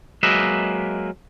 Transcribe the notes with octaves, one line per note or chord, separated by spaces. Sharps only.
F#3 G#3 A#3 B4 D#5 E5